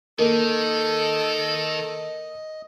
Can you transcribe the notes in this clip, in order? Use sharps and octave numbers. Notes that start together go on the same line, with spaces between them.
D#3 A#3 A4 D#5